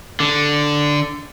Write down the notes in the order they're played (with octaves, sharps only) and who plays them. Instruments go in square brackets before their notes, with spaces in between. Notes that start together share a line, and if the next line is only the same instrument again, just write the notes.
[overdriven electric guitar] D3